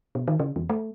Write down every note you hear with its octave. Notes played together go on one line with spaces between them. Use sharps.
B2
D#3
C#3
E2
A3